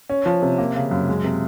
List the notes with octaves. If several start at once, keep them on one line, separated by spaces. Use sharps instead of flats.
C#4
F3
C3
A#3
C#3
F#2
G#3
C3